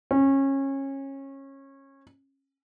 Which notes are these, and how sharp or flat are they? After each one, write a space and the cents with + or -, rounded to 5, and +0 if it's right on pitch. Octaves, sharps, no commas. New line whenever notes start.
C#4 -25